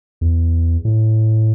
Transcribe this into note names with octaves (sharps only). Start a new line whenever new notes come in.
E2
A2